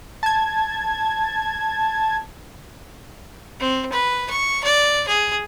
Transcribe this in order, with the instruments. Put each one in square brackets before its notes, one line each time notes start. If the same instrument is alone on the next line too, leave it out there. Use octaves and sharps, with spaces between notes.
[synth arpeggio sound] A5 G#6
[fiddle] C4
B4
C#6
D5
G#4